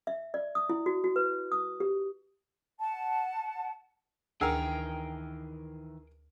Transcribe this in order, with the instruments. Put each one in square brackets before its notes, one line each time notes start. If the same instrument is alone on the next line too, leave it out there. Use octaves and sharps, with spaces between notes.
[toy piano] E5
D5
D#6
E4
F#4
F#4
B4
D#6
G4
[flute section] F#5 A5
[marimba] D2 E6 [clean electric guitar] D#3 E3 [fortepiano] G#4 A#4 [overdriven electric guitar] G5